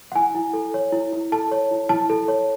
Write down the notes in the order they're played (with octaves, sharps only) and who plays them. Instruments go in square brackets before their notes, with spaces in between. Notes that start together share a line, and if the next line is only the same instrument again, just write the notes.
[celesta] F#5
E4 G#5
E4
A4
C#5
E4
E4
A4 A5
C#5
E4
E4 A5
A4
C#5